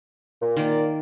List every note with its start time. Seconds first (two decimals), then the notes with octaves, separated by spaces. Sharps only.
0.42 A#2
0.57 D#3 A#3 D5